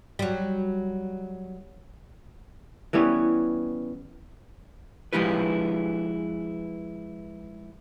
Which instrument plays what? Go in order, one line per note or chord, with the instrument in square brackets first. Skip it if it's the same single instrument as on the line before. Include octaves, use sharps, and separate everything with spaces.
[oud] F#3 G3
[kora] E3 G3 B3 C#4
[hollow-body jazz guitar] F3 G#3 E4 F4 G4 B4